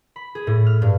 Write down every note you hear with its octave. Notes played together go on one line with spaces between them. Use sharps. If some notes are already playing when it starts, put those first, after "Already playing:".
B5
G#4
A2
F6
G2